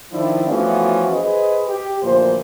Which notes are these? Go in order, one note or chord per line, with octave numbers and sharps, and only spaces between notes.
D#3 F3 D4 E4
E3 F3 A3 B3 C#4 F#4
G#4 B4 C5 D#5
G4
D2 A#2 E3 F3 C5